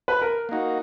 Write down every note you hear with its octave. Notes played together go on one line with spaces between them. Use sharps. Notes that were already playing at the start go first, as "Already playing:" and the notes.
B4
A#4
A#3 D#4 F#4